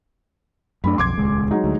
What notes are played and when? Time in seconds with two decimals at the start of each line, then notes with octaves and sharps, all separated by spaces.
0.84 F#2 A3 D4 B5
0.98 B1 F2 C6 D6 G#6
1.18 D#1 C#2 G#3
1.51 F#3 G#3 D#4
1.64 D2